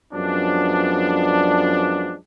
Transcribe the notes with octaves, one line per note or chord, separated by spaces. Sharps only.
F#2 F3 G#3 B3 D4